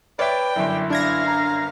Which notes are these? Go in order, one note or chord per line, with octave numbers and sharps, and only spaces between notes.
B4 C#5 D5 E5 G5 B6
G1 F#2 E4
D4 F5 G#6 A#6
A#5